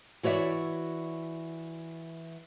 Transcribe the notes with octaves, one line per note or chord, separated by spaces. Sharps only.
E3 F#4 C#5 D5 E5